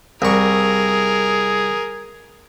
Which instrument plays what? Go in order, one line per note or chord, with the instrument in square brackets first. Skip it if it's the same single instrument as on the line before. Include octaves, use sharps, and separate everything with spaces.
[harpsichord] C2 C#6 [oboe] G#4 [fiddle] A#4